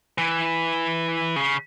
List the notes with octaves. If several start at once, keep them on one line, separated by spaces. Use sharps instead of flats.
E3
C#3